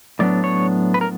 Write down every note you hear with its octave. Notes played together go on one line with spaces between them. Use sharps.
A2 F#3 B3 D4 D5
C#5
B4
A#4